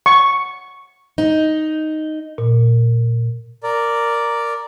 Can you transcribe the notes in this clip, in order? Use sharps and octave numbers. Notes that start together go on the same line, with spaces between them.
C#6
D#4
A#2
A#4 D5